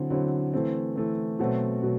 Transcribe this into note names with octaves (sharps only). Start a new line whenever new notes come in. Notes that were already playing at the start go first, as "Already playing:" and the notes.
Already playing: D3 F#3 C4 E4
D3 F#3 C4 E4
E3 A3 C4
E3 A3 C4
B2 F#3 A3 C4 F#4
B2 F#3